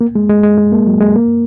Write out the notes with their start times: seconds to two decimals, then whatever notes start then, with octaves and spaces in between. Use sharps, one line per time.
0.01 A#3
0.15 G#3
0.29 G#3
0.43 G#3
0.58 G#3
0.72 A#3
0.87 F#3
1.01 G#3
1.16 A#3